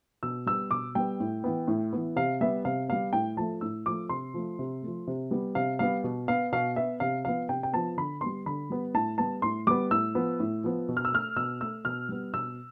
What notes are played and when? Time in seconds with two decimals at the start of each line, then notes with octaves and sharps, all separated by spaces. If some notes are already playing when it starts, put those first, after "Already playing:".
0.23 B2 E6
0.46 G3 B3 E6
0.71 B2 D6
0.95 G3 B3 G5
1.20 A2
1.44 E3 B3
1.68 A2
1.93 E3 B3
2.16 C3 F5
2.41 G3 B3 E5
2.65 C3 F5
2.88 G3 B3 F5
3.13 A2 G5
3.37 F3 A3 A5
3.61 A2 E6
3.86 F3 A3 D6
4.09 C3 C6
4.34 F3 A3
4.59 C3
4.82 F3 A3
5.07 C3
5.31 G3 B3
5.55 C3 F5
5.79 G3 B3 F5
6.04 B2
6.28 B3 F5
6.52 B2 F5
6.76 B3 E5
7.00 C3 F5
7.24 F3 B3 F5
7.49 C3 G5
7.63 G5
7.73 F3 B3 A5
7.97 D3 B5
8.21 G3 B3 C6
8.46 D3 B5
8.70 G3 B3
8.94 A2 A5
9.18 G3 B3 A5
9.42 A2 C6
9.67 G3 B3 D6
9.91 A2 E6
10.15 F3 B3
10.40 A2
10.64 F3 B3
10.89 B2
10.97 F6
11.05 E6
11.12 A3 F6
11.36 B2 E6
11.61 A3 E6
11.85 B2 F6
12.09 G3 B3
12.33 B2 E6